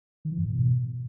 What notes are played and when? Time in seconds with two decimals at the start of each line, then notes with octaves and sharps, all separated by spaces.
0.25 D#3
0.32 E3
0.39 G2
0.46 A2
0.53 B2